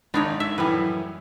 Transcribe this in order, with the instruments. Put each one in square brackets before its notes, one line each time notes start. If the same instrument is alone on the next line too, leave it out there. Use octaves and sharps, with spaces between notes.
[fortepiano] G#1 B5 [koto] D4 D#4 C#5
[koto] E5
[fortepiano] F#2 A2 E3 [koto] G3 B4